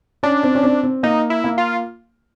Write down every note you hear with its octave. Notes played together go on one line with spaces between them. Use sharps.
C#4 D4
C4
C#4
C4
C4
A#3 D#4
E4
A#3
F4